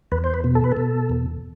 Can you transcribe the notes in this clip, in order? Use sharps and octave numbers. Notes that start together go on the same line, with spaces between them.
E2 B4
C5
B4
B2
A4
B4
B2 A4
E2